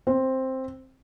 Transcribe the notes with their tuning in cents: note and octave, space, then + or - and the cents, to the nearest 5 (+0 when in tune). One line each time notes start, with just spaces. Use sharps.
C4 +5